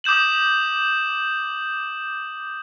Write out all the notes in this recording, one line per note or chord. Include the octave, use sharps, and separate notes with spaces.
D6 D#6 G6 E7 F#7